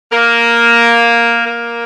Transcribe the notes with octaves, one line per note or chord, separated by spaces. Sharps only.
A#3
A#3